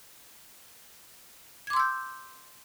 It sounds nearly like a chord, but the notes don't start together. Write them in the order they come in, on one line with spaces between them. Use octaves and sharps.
G#6 D6 C6 E6 G6